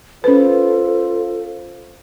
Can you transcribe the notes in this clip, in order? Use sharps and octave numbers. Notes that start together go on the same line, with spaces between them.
C#4 F4 A4 B4 C5